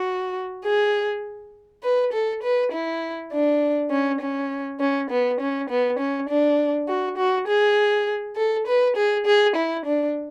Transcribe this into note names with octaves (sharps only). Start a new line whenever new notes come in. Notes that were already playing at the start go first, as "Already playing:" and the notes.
Already playing: F#4
G#4
B4
A4
B4
E4
D4
C#4
C#4
C#4
B3
C#4
B3
C#4
D4
F#4
F#4
G#4
A4
B4
G#4
G#4
E4
D4